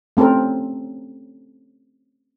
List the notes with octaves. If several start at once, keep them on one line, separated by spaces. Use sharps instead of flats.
A3 C4 C#4 A4 A#4